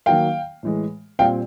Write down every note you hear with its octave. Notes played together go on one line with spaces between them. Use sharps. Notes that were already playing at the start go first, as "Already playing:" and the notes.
D#3 F#3 A#3 F5 G5
A2 E3 G#3
A#2 G3 C4 F5 G5